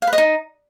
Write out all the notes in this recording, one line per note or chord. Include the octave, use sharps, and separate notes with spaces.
F5
B4
D#5
D#4